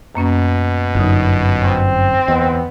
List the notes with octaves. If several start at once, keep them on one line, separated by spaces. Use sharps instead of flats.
F#2 B2 A#3 C#4
G1 F#2 D3 D#4
C4
E2 B3 D#5